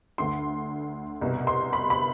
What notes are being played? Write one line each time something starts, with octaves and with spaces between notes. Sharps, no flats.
D2 D3 C6
C2 B2
C6
B5
B5